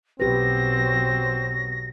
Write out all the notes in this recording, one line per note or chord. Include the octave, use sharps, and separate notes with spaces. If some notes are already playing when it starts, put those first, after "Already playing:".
B1 F#3 C4 G4 B4 A#6